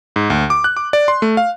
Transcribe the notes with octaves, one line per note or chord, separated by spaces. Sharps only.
G#2
D2
D6
F#6
D6
D5
C6
A3
F5